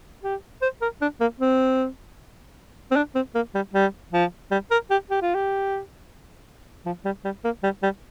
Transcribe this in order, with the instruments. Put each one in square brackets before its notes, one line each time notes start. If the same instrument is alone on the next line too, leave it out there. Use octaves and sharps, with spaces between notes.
[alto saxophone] G4
C5
A#4
D4
A#3
C4
C4
D4
C4
A#3
G3
G3
F3
G3
A#4
G4
G4
F4
G4
F3
G3
G3
A#3
G3
G3